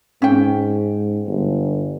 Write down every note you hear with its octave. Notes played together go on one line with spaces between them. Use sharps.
G#2 C#4 G5
G1